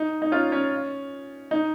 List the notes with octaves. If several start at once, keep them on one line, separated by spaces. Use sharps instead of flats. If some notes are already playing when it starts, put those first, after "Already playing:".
Already playing: D#4
D#4
C#4 F4
C#4
D#4